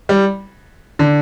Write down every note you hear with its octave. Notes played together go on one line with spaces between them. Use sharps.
G3
D3